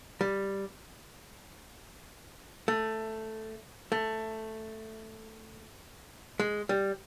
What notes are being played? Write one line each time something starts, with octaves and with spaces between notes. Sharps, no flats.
G3
A3
A3
G#3
G3